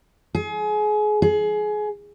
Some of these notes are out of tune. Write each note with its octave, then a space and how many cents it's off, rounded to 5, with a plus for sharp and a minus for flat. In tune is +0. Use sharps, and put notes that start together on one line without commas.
G#4 +30
G#4 +25